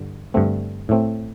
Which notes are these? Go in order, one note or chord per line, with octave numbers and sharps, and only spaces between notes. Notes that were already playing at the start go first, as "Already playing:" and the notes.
Already playing: G2 D3
G2 D3 A3 C4
A2 A3 C4